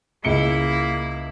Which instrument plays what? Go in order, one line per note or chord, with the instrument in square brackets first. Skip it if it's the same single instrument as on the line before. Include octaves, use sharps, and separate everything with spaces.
[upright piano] C#2 C#7 G7 [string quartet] A#3 E4